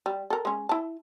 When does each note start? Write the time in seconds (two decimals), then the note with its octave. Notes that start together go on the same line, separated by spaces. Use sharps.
0.06 G3
0.30 A4 A#4
0.45 G#3 C#4
0.69 E4 A5